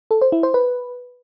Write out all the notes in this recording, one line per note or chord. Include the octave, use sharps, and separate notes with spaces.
A4
C5
E4
C5
B4